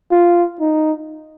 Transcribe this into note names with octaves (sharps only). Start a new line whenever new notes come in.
F4
D#4